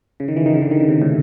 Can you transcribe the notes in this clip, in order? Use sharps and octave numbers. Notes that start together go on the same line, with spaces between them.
C#3
D#3
E3
D#3
C#3
D3
D#3
C#3
C3
A2